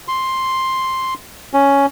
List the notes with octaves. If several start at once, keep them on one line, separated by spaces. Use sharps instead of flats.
C6
C#4